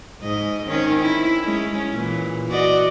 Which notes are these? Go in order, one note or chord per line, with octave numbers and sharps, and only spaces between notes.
G#2 D#5
D#3 C4 C#4
E4
G#3 C#4
A#2 E3
F#4 D5 D#5